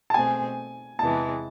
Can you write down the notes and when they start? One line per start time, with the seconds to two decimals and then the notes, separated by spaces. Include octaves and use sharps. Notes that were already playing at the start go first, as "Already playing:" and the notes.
0.10 A5
0.14 B2 A3 C4 G#4 C5 G#5
0.99 E2 C3 E3 G#3 B3 A5